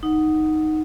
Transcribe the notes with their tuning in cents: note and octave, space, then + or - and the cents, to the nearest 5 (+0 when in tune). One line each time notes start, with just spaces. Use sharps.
D#4 +0 F#5 +0